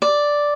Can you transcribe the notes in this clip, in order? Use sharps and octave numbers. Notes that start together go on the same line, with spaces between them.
D5